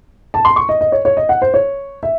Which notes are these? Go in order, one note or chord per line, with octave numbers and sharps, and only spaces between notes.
A5
C6
C#6
D#5
D#5
C#5
C#5
D#5
F#5
C5
C#5
E5